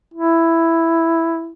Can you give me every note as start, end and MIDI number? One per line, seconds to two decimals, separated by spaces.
0.14 1.53 64